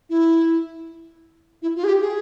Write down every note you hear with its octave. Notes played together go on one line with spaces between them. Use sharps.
E4
E4
F4
G#4
G4
G#4